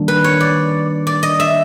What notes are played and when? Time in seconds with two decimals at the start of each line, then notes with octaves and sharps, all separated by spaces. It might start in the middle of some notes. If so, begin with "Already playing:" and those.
Already playing: D#3 G3 A#3 D4
0.08 B4
0.24 C#5
0.40 D5
1.07 D5
1.23 D#5
1.40 E5